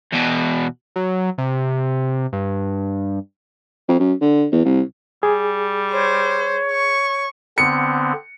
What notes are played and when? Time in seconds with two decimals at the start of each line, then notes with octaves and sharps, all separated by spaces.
0.13 E2 B2
0.96 F#3
1.38 C3
2.33 G2
3.88 F2
4.00 F#2
4.21 D3
4.52 E2
4.65 C2
5.23 G3 G#4
5.92 C5 C#5
6.72 C#6
7.58 D3 B3 C4 C#7